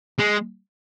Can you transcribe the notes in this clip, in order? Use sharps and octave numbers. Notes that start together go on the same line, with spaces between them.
G#3